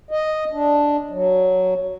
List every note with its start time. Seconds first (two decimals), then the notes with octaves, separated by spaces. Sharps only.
0.11 D#5
0.53 D4
1.10 F#3